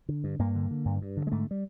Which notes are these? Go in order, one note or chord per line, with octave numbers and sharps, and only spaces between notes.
D3
G2
G2 A#3
D3
D3
G2
G2
D3
G#3
G#2 A3
G3